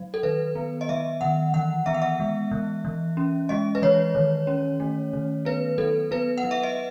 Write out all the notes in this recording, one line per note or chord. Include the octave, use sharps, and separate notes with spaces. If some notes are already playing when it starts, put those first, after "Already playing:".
Already playing: F#3
A4
D#3 B4
B3
D#5
F#3 E5
D#3 F#5
E3 F#5
B3 E5
F#5
E5
G#3
E3
E3
C#4
G#3 D#5
B4
E3 C#5
D#3
C#4
A3
D#3
B3 B4
F#3 A4
B3 B4
F#5
F#3
E5
D#5